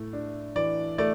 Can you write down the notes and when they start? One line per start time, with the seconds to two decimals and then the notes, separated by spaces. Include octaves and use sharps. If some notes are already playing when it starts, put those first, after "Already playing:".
Already playing: A2 A3
0.13 D4
0.56 E3 D5
0.98 A3 D5